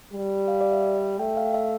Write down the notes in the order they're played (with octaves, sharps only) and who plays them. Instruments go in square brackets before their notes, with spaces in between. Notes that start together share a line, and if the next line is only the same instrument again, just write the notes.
[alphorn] G3
[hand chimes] F5
D5
E5
[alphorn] A3 [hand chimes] G5
[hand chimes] F5
E5